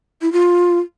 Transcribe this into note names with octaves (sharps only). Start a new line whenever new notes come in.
E4
F4